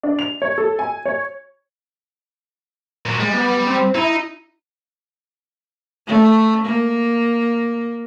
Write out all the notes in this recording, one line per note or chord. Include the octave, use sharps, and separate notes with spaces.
D4
F7
C#5
A4
G#5
C#5
A#2 F#3
G3 G#3
B3
C4
D#4 E4
A3
A#3